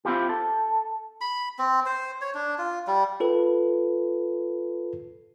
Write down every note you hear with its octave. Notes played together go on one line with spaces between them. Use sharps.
C4 E4 F4 G4
A4
B5
C4
C5
C#5
D4
F4
G3
F4 A4 B4